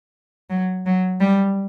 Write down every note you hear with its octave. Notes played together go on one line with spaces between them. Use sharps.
F#3
F#3
G3